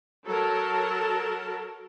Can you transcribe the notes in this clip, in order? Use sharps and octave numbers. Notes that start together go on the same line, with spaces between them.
F#3 A4 A#4 A5